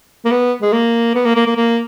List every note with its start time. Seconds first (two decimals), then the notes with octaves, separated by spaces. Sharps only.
0.25 A#3
0.31 B3
0.62 G#3
0.73 A#3
1.15 B3
1.25 A#3
1.36 A#3
1.46 A#3
1.56 A#3